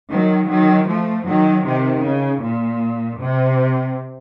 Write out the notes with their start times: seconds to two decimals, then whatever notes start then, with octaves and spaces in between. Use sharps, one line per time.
0.11 D#3 F#3
0.50 D#3 F#3
0.88 F3 A3
1.27 D#3 F#3
1.66 C3 D#3
2.05 C#3
2.43 A#2
3.21 C3